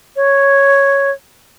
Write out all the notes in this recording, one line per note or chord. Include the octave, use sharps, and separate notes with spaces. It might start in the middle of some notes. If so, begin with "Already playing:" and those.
C#5